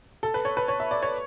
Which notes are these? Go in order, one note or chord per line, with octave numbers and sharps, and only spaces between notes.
A4
B4
C#5
B4
C#5
E5
D5
C#5